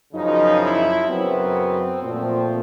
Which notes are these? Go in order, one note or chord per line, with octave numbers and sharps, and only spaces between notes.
F#2 C#3 F3 D#4
E4
F#2 C#3 F#3 B3 C4
A#2 F3 A3 C4